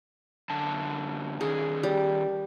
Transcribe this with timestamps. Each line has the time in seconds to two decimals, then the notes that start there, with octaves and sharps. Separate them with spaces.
0.50 F#2 D3 A5
1.41 D#3 C#4 G#4
1.83 G3